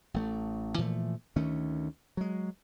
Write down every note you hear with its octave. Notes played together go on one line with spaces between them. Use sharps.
A1 A3
A#2 E3 F3 A3
D2 D#3 A3 C#4
F#3 G#3